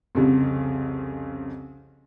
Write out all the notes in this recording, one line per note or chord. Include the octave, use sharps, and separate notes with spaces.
C2 F2 C#3